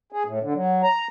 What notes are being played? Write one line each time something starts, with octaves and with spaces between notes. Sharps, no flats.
G#4
A2
D3
F#3
A#5